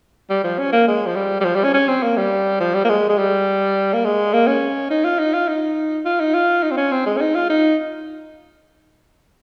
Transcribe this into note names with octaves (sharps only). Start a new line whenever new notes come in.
G3
F3
C#4
A#3
G#3
F3
G3
G3
F3
G3
C#4
C#4
C4
A#3
G3
F3
G3
A#3
G#3
G#3
G3
A#3
G#3
A#3
C#4
D#4
F4
D#4
F4
D#4
F4
D#4
F4
D#4
C4
C#4
C4
G#3
C#4
D#4
F4
D#4